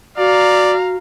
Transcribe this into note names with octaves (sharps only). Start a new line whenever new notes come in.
F#4 D5 F5 A#5